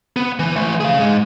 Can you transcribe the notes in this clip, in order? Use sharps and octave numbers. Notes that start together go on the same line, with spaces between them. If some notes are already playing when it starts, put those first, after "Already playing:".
B3
E3
E3 A3
G#4 F5
G#2 G#3